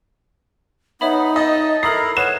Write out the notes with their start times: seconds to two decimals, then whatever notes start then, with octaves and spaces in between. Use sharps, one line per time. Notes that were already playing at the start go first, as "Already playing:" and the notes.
1.01 B3 D#4 C#5 E5 B5
1.36 D#5 A5
1.83 E4 A4 A#4 A#5 D#6 C7
2.17 B4 C#5 F#5 E7